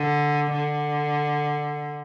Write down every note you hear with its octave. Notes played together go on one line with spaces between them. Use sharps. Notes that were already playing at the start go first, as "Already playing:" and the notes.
Already playing: D3
D3